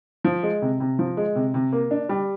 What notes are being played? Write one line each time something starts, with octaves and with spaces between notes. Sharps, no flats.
F3
G#3
C3
C3
F3
G#3
C3
C3
A#3
D4
G3